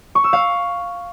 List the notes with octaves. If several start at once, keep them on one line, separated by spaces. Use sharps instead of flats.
C#6
E6
F5